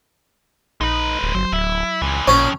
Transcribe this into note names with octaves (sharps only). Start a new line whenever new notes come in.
A#1 G#3 D#4 B4
D1
G1 F#3 C5
D1 E4
C#2 A#2 E3
A1 F2 A#2 C#3 C#4